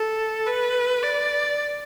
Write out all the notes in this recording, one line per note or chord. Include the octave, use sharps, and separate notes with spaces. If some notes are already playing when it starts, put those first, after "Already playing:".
Already playing: A4
B4
D5